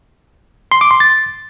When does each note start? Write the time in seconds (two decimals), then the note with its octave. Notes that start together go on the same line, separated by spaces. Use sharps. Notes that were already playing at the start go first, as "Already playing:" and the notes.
0.71 C6
0.81 D6
0.91 C6
1.00 A6